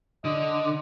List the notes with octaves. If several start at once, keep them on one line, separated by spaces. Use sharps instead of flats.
D3 D#5